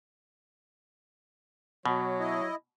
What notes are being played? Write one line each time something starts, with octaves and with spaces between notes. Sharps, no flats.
B2 F#3 C#5
E4 D#5